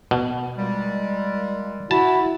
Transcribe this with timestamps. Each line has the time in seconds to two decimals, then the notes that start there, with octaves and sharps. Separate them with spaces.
0.11 B2
0.58 A#2 G3 G#3
1.91 E4 F#4 A5